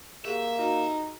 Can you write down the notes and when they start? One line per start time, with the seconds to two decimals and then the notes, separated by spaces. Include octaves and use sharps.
0.25 A#3 G4 G#4 E5
0.58 D#4 F#4